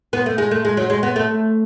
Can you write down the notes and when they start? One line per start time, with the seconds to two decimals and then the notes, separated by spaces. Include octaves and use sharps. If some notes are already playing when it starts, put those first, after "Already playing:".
0.13 B3
0.26 A3
0.38 G#3
0.51 A3
0.65 G#3
0.77 F#3
0.90 G#3
1.03 B3
1.16 A3